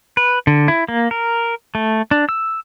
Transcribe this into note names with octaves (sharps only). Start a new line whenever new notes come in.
B4
D3
E4
A#3
A#4
A3
D4
E6